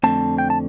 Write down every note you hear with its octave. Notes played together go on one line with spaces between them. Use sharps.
F2 D3 A3 C4 A5
G5
A5